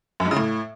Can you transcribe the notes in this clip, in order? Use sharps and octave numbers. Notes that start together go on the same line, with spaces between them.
F#2
G#2
C#3
A2